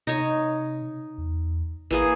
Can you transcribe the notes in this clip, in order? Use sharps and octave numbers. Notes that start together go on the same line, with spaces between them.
C3 D#4 C#5
E2
A1 E3 A#3 G#4